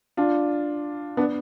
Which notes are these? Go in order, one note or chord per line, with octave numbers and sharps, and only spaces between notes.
D4 F4
B3 D4